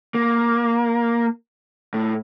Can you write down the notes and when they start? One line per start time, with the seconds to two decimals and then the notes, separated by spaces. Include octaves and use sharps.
0.15 A#3
1.94 A2